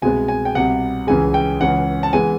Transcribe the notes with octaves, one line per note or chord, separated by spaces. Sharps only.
C2 B2 G#3 B3 G#5
G#5
G5
C2 B2 G3 F#5
C#2 C#3 E3 G#3 G#5
G5
C#2 C#3 E3 F#5
A5
E3 G#3 B3 G#5